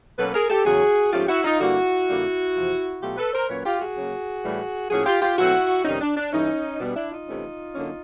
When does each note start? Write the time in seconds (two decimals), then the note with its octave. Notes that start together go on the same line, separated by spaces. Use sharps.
0.18 B2 F#3 A#3 C#4 A4 B4
0.35 G#4 A#4
0.50 G4 A4
0.65 E2 C#3 F#3 F#4 G#4
1.13 G#2 F3 A3 C#4 F4 G4
1.29 E4 F#4
1.44 D#4 F4
1.60 G2 D3 G3 A#3 E4 F#4
2.08 F2 D3 G3 A#3
2.55 E2 C3 F3
3.01 B2 F#3 A3 F4 G4
3.17 A4 B4
3.33 A#4 C5
3.49 A#2 F#3 A#3 C#4 B4 C#5
3.65 F4 G4
3.80 F#4 G#4
3.96 C#3 F#3 A#3
4.44 A2 E3 G3
4.90 A2 F3 A#3 C#4 F#4 G#4
5.06 F4 G4
5.22 F4 G4
5.38 B2 F#3 A3 C4 E4 F#4
5.85 F2 C3 D#3 G3 C#4 D#4
6.01 D4
6.17 D4
6.32 G2 E3 A3 C#4 D#4
6.80 B2 G3 B3 D4
6.96 D4 E4
7.11 D#4 F4
7.27 C3 E3 A3 C#4
7.74 D3 F#3 A#3 C#4